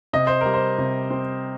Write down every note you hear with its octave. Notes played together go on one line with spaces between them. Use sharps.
C3 D#5
C5
G3 A#4
C5
C3
C4